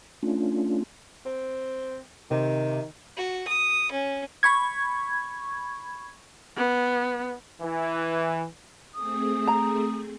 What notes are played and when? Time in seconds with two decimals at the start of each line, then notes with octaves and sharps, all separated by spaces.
0.23 A3 C#4 D4 F4
1.26 C4
2.31 C3 D#3
3.17 F#4
3.47 D#6
3.92 C#4
4.43 B5 C#6 G#6
6.57 B3
7.62 E3
8.95 A3 C4 G#4 D#6
9.47 A#5